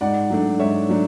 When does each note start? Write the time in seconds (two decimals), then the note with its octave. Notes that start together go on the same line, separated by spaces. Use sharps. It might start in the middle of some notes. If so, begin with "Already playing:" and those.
0.01 G#2 D5 F#5
0.30 F#3 A3 D4
0.59 G#2 C#5 E5
0.89 F#3 A3 D4